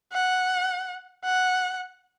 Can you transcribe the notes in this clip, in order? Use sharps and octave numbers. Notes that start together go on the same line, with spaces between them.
F#5
F#5